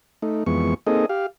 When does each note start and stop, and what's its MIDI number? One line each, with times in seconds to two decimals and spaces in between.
0.22 0.44 57
0.22 0.44 63
0.46 0.74 41
0.46 0.74 52
0.46 0.74 56
0.46 0.74 59
0.46 0.74 85
0.87 1.06 58
0.87 1.06 60
0.87 1.06 63
0.87 1.06 68
0.87 1.06 69
0.87 1.06 75
1.09 1.26 67
1.09 1.26 77